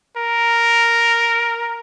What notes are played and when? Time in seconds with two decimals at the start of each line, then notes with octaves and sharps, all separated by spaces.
0.17 A#4